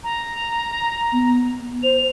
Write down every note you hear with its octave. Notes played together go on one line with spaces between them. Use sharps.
A#5
B3
C5 F7